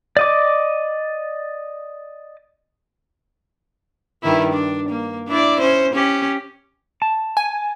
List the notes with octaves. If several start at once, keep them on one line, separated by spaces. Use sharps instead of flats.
D5 D#5 D6
G2 D#3 E4
D4
A#3
D4 E4 D5
C#4 C5
C#4 G4
A5
G#5